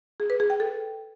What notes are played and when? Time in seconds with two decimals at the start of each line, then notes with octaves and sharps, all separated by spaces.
0.20 G#4
0.30 B4
0.40 G#4
0.50 G5
0.60 A4